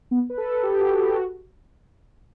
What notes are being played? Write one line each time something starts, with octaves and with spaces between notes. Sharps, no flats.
B3
B4
A4
G4
F#4
G4
F#4